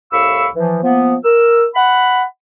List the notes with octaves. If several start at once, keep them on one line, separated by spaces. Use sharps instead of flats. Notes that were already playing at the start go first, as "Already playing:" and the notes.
C2 A2 F5 B5 C#6 E6
E3 F3
F3 A#3 B3
A#4 E6
F#5 B5